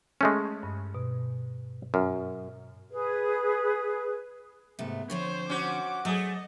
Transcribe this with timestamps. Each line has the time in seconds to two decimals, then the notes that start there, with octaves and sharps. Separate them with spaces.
0.21 G#3 A3 C#4
0.63 G2
0.95 B2
1.94 F#2 F6
2.90 G#4 B4
4.79 G#2 C3 A3 B3
5.10 D3 F3 C4 C5 C#5
5.49 C#4 F#4 C5 D6
6.05 F#3 A3 G#4 D#5